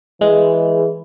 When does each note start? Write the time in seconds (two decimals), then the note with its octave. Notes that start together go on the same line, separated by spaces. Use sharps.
0.21 E3 G#3